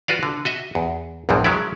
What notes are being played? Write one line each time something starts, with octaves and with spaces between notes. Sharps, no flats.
F4 F#4 B4 D5 F5
D3
F#4 D#5 E5
E2
A#1 E2 G2 E3 F3
F#3 G#3 C#4 E4 D5